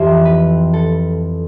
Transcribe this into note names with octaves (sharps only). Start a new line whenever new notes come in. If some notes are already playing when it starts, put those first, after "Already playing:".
Already playing: F2 E3 G3 C5
B4
A4